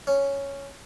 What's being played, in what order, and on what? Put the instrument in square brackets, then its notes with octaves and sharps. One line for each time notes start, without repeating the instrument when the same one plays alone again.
[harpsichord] C#4